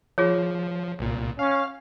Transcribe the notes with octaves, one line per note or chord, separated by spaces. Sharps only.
F3 F4 G#4 C#5
C2 A#2
C#4 F5